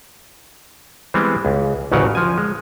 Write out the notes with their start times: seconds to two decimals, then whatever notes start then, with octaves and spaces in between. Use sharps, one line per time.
1.14 E3 G3 G#3 B3 C4
1.45 C#2
1.92 A1 D2 C#3 F#3 A#4 F#5
2.15 F3 G#5
2.38 G#3